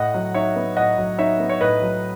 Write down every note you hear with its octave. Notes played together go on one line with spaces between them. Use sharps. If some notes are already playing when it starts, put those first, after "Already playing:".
Already playing: A2 D#5 F#5
F#3
D#4 C#5 E5
B3
A2 D#5 F#5
F#3
D#4 C#5 E5
B3
C#5
A2 B4 D#5
F#3